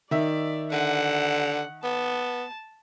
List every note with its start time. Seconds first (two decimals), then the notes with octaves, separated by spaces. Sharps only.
0.11 D#3 D5 E5
0.72 D3 F#5
1.84 B3 A5